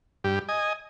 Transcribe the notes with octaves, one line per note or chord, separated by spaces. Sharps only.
G2 G4
D#5 G#5